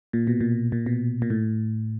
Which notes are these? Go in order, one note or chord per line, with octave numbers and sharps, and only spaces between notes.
A#2
B2
A#2
A#2
B2
A#2
A2